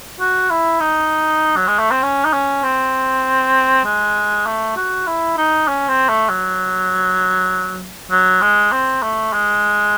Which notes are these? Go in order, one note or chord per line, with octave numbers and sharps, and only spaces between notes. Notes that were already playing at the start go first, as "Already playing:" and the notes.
F#4
E4
D#4
F#3
G#3
A3
C4
C#4
D#4
C#4
C4
G#3
A3
F#4
E4
D#4
C#4
C4
A3
F#3
F#3
G#3
C4
A3
G#3